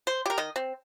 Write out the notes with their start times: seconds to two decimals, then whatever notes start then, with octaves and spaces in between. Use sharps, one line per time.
0.07 C5
0.26 G4 A#4
0.38 D#3 D#5
0.56 C4